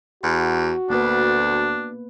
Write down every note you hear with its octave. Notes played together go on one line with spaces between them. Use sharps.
E2 F#4
D2 A#3 B3 D4 B4